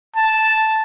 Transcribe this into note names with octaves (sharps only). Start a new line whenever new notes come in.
A5